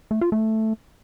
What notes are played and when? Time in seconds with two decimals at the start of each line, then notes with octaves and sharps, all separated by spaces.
0.11 A3
0.21 F4
0.32 A3